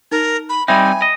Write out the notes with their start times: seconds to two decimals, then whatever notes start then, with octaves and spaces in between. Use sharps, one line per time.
0.12 D#4 A#4
0.49 B5
0.68 G3 C4 D#4 E5 G5 G#5 B5
1.02 D#5